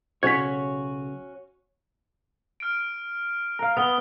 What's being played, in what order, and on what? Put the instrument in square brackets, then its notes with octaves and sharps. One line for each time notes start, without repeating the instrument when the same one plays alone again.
[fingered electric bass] B1 C#3 [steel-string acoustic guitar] C#4 F#4 [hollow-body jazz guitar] C#5 [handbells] G#6 B6
[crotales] F6 D7
[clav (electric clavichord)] A#4 F5
[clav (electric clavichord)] B3 [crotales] D#6 G7